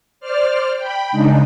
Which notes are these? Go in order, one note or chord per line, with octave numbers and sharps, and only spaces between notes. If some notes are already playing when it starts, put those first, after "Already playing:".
C5 D5 F6
G5 B5
C#3 G#3 D4 D#4